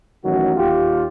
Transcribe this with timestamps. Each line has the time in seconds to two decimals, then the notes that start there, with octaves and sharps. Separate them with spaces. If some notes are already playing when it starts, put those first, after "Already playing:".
0.24 A1 D#3 F#3 F#4
0.56 D#2 F4 G4